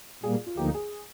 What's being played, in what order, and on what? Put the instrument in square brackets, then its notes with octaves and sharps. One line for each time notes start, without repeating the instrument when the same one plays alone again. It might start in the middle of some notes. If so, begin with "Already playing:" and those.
[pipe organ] A#2 G3 A#3 [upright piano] G#4
[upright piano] F4
[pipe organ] D2 D3 F3 A#3 D#4 [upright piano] G4
[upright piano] G#4